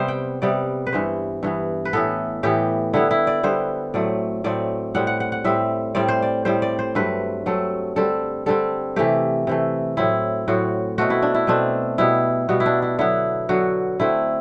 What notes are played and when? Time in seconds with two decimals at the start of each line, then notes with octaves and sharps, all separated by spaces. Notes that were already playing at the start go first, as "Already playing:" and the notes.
Already playing: C3 G3 B3 C5
0.08 G5
0.42 C3 G3 B3 D5
0.87 B4
0.92 G2 E3 B3 C5
1.43 G2 E3 B3
1.85 B4
1.93 A2 E3 B3 A4
2.43 A2 E3 B3 G4
2.94 D3 G3 B3 E4
3.11 E4
3.27 D5
3.43 D3 G3 B3 C5
3.94 A2 F#3 A3 C4 D5
4.44 A2 F#3 A3 C4 D5
4.95 A2 G3 C4 F#5
5.07 F#5
5.20 F#5
5.32 F#5
5.44 A2 G3 C4 E5
5.95 A2 G3 C4 D5
6.08 C5
6.22 D5
6.45 A2 G3 C4 C5
6.62 D5
6.79 C5
6.95 G2 F#3 A3 C4 B4
7.46 G2 F#3 A3 C4 A4
7.96 D3 G3 C4 A4
8.46 D3 G3 C4 A4
8.96 C3 E3 A3 G4
9.47 C3 E3 A3
9.97 A2 F#3 C4 E4
10.48 A2 F#3 C4 F#4
10.98 B2 A3 C4 F#4
11.10 E4
11.22 D4
11.35 E4
11.47 B2 A3 C4 D4
11.98 B2 G3 B3 E4
12.49 B2 G3 B3 F#4
12.60 E4
12.66 D4
12.82 E4
12.99 D3 F#3 B3 E4
13.49 D3 F#3 B3 F#4
14.00 D3 A3 C4 E4